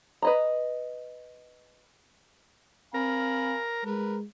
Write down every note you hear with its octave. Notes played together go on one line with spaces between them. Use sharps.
B4 D#5 A#5
C4 A#4 F5 G#5 B5
G#3 A#4 B4